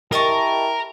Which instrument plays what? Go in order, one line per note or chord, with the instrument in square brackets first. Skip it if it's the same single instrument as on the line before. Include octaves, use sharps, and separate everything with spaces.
[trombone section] E4 G4 [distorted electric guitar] A#4 [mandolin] D#5 A5 C#6